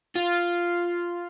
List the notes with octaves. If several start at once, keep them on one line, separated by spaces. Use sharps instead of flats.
F4